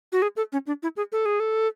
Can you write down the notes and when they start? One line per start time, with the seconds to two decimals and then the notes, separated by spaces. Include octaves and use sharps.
0.12 F#4
0.22 G#4
0.37 A4
0.52 C#4
0.67 D4
0.83 E4
0.97 G#4
1.12 A4
1.26 G#4
1.40 A4